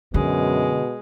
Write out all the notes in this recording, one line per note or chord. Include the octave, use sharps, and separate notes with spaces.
F#2 B2 D3 G#3